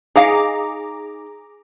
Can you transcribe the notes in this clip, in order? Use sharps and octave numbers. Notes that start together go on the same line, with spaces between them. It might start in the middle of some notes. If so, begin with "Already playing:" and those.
D#4 G#4 F5 A#5 D6